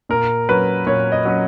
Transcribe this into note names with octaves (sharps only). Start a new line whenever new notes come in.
A#2 A#4
F#3 C#4 B4
A#2 C#5
D#5
F#3 C#4